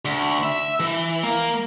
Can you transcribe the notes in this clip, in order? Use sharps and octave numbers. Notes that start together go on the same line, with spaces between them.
D2
E5
E3
A#3